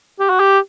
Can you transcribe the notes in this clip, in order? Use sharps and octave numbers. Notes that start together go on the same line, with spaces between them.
G4
F#4
G4